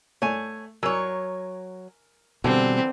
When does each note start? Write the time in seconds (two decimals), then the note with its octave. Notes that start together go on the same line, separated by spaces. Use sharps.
0.22 A3 C#5 G#5
0.83 F#3 A#4 C#5 G#5 E6
2.44 B2 D3 E3 G3 C4